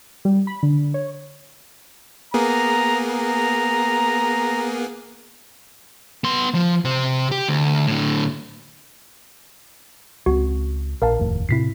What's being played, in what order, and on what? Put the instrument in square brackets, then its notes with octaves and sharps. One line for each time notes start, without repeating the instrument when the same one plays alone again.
[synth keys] G3
B5
D3
C#5
[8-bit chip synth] A#3 B3 G#4 [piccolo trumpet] A#5
[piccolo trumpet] A#5
[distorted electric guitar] B3 C6
F3
C3 C5
G4
D2
A2 D3
[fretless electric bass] C#2 G#3 C4 [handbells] F#4
[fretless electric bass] A#1 [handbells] A#4 F5 A5
[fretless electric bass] F1 D#2 A2
[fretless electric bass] A2 C3 C4 [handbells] E4 B6 C7